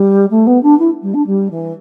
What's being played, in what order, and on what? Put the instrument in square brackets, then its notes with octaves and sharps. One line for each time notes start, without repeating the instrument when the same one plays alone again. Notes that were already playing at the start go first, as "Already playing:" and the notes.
Already playing: [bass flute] G3
A3
B3
D4
E4
G3
D4
G3
E3